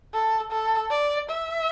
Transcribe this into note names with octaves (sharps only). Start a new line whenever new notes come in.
A4
A4
D5
E5